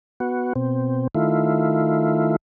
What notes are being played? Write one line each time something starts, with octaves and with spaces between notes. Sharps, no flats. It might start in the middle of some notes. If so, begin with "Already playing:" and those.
B3 F#4
B2 C4
D#3 A3 E4 F4